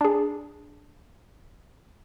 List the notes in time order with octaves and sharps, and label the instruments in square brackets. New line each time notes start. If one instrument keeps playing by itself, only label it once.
[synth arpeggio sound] D4 G#4